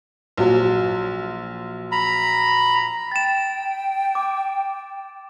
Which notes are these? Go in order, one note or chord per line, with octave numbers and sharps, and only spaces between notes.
A#1 F3 F#3
A#5 B5
G5 A6 E7
D6